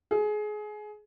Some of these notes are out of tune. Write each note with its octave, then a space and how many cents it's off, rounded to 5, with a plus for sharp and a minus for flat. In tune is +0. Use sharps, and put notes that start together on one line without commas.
G#4 +25